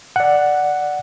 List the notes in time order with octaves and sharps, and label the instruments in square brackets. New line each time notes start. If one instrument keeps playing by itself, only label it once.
[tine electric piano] D5 F#5